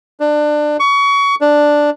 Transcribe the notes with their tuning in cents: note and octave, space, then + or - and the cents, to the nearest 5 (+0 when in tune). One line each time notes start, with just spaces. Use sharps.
D4 +25
C#6 +25
D4 +5